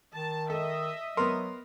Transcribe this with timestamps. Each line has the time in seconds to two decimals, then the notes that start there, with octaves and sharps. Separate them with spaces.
0.15 D#3 A5
0.50 A4 D#5 E5
1.17 F#3 B3 A#4 C6